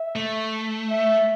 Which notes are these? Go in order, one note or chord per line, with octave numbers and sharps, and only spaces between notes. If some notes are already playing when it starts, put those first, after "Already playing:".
Already playing: E5
A3
E5